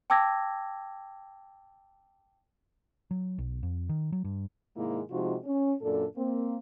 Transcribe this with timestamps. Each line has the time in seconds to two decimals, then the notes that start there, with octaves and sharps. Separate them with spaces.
0.10 G5 A5 D6 E6 G#6 A#6
3.11 F#3
3.38 B1
3.63 F2
3.89 D#3
4.12 F#3
4.24 G2
4.76 G#2 C3 D#3 G#3 A#3 E4
5.10 C3 F3 G#3 D#4 F4 F#4
5.45 C#4
5.82 F#2 A#2 D4 A4
6.17 A#3 C4